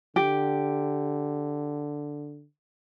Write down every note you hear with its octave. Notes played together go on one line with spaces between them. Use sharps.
D3 G4